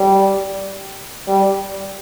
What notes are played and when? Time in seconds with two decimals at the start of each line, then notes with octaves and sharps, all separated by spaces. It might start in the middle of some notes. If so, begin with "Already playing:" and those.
Already playing: G3
1.27 G3